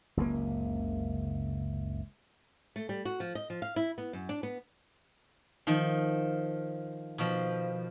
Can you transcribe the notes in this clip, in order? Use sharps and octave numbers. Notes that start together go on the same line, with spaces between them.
F#1 C#2 C3 A#3
A3
G3
F#4
F3
D#5
F3
F5
E4
B3
F#2
D4
B3
D#3 F3
B2 F3